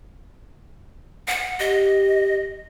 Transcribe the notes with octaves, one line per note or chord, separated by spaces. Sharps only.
F#5
G4 D#5